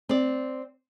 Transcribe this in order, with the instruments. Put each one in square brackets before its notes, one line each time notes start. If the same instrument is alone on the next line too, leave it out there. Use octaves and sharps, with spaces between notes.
[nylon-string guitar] C4 D5